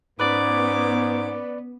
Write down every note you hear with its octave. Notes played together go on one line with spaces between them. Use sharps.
G#2 B3 C#4 B4 D5 D6